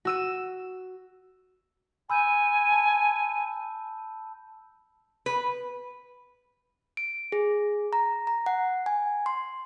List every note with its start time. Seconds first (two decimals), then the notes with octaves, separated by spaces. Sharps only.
0.05 F#4 E6 D#7
2.10 G#5 B5 E6 G6
2.72 A5
5.26 B4
6.97 D7
7.32 G#4
7.93 A#5
8.27 A#5
8.46 F#5
8.86 G#5
9.26 C6